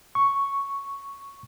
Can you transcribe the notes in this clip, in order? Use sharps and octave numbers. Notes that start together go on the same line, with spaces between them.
C#6